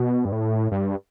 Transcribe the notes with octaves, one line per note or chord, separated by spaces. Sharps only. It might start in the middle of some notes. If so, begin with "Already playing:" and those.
Already playing: B2
G2
A2
G2